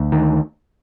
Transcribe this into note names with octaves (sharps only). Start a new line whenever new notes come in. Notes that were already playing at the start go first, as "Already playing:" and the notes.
Already playing: D2
D#3